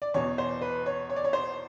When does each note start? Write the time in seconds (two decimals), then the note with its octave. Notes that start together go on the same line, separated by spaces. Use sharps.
0.02 D5
0.14 E2 B2 C#5
0.38 C5
0.61 B4
0.86 C#5
1.10 C#5
1.16 D5
1.25 C#5
1.33 C5